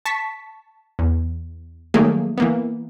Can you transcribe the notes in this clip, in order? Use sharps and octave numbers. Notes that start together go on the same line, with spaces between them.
A5 C#6 B6
E2
D#3 F#3 G3 A3 A#3 G#4
E3 A#3 B3